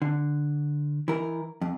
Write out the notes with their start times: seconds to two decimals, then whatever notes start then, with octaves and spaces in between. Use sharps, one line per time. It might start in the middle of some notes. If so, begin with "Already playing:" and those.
0.02 D3
1.08 E3 A#4
1.61 F2